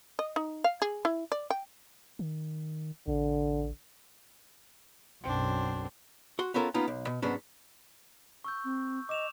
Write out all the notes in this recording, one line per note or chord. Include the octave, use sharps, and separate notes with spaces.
D#5
D#4
F5
G#4
E4
D5
G5
D#3
A1 D3
B1 F#2 C4 D4
F#4 F#5 C6
B3 C#4 F4 A4 A#4
A#3 B3 C#4 D#4 F4
B1
B2
G#2 F#3 B3 C#4 D4
C#6 E6 G6
C4
D#5 D6 E7 F7